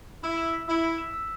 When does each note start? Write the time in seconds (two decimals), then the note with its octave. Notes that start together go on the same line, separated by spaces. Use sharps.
0.24 E4 E6
0.38 E7
0.53 B6
0.68 E4 E6
0.84 B6
0.98 E7
1.14 E6